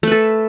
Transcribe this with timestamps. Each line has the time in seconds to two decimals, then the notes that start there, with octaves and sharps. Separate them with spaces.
0.03 A3
0.07 B4
0.12 A4